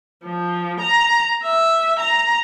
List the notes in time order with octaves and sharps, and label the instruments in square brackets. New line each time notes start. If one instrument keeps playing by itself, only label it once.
[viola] F3
A#5
E5
A#5